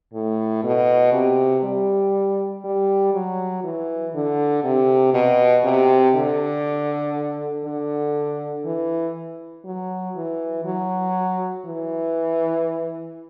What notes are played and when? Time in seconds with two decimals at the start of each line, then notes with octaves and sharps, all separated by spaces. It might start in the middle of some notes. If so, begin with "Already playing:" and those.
0.14 A2
0.63 B2
1.13 C3
1.64 G3
2.64 G3
3.14 F#3
3.64 E3
4.15 D3
4.64 C3
5.14 B2
5.64 C3
6.15 D3
7.65 D3
8.66 E3
9.65 F#3
10.16 E3
10.65 F#3
11.65 E3